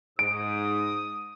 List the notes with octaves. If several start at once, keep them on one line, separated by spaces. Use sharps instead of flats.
G#2 D#6 D7